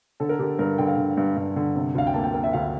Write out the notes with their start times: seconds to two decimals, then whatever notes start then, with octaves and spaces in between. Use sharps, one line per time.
0.20 D3 A4
0.29 A#4
0.39 D3 G4
0.59 G2 A#4
0.78 D3 G5
0.88 F5
0.97 D3
1.17 G2
1.37 G2
1.56 D3
1.76 C3
1.95 D2 F5
2.07 G5
2.14 A#3 A5
2.24 G5
2.34 A#3 G5
2.44 E5
2.53 D2 F5